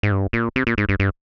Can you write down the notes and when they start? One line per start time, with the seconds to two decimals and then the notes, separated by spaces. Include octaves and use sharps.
0.03 G#2
0.12 G2
0.33 A#2
0.56 C3
0.67 A#2
0.78 G#2
0.89 G2
1.00 G2